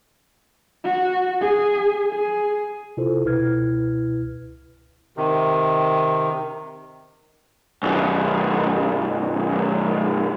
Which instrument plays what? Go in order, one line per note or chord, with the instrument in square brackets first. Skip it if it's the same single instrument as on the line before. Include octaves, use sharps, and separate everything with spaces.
[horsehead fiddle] F#4
G#4
G#4
[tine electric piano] C3 E4 F4 A4 C5
C#2 B2 E4 B4 F6 G#6
[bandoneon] C3 D#3
[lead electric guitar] B1 F#2